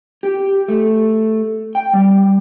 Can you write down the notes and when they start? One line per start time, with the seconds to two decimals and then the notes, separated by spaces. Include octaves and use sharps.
0.23 G4
0.68 A3
1.75 G5
1.93 G3